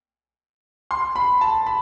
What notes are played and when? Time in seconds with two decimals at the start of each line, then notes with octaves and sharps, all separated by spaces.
0.91 C6
1.16 B5
1.41 A5
1.66 B5